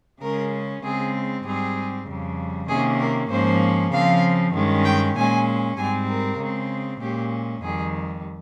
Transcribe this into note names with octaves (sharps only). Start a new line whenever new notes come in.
C#3 G#3 C#4 A#4
C#3 G#3 C4 G#4
G#2 G3 C4 G#4
F2 C#3 G3
C3 D#3 A#3 C#4 G#4
A#4
G#2 F3 A#3 C#4 C5
C#3 F3 C4 F5
G2 D#3 G#3 C#4
G5
A#2 G#3 C#4 G#5
G#2 G3 C4 G#5
A#4
C#3 G#3 C4
A#2 G#3 C#4 G4
F2 D#3 G3 G#4